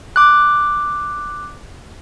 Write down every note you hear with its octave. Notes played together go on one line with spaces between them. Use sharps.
D6 F#6